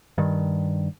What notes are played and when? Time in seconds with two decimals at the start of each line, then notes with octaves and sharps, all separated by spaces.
0.18 G2 D#3